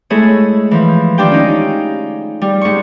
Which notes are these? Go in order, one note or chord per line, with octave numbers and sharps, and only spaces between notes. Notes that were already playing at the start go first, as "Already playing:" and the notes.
G#3 A3 E4 G#4 A4 C#5
E3 F3
D#3 D4 F4 G4 G5
C#4 D#4
G3
G#2 C#6